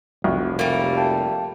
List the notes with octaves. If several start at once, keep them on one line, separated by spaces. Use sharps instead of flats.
F1 C2 F#4
G3 A3 A#3
F5 G5 A5